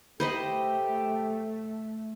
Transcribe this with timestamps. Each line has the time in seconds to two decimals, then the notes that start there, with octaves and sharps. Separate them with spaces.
0.20 A3 G4 B4 C5 D#5 B5